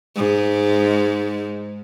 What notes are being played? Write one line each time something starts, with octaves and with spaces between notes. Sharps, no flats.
G#2 G#3